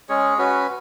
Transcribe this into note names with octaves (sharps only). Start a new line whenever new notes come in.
G#3 C#4 G#4 C#5
C#4 F#4 B4